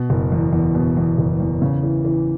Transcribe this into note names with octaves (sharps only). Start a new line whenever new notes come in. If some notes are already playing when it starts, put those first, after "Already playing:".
Already playing: B2
F#1
E2
E2
B2
E2
F#1
E2
C#3
E3
E3